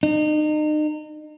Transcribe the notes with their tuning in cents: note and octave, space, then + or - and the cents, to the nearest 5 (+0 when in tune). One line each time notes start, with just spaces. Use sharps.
D#4 -35